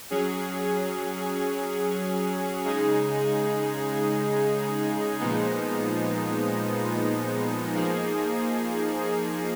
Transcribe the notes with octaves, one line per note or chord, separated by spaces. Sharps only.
F#3 C#4 G#4
C#3 G#3 D#4 G#4
A#2 F3 G#3 B3 D#4
F3 A#3 D#4 G#4